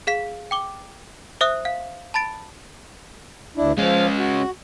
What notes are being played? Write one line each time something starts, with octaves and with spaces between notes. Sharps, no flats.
G#4 F5 B6
G5 D6 G7
C5 E5 D#6 F#6
F5
A5 B5 A6 D7
D2 D4 E4
F3 G#3 C#4 F5
F#4